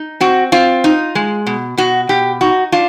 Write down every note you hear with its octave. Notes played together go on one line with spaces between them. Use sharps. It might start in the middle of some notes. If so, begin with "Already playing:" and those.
Already playing: D#4
C4 F#4
C4 F4
D#4
G#3
B2
B2 F#4
B2 G4
D#4 F#4
D4 F4